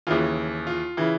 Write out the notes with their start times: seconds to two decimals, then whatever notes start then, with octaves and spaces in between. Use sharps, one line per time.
0.07 D#2 C#3 E3 F4
0.67 F4
0.97 C#3 E3